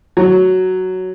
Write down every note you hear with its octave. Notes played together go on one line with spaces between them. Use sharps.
F#3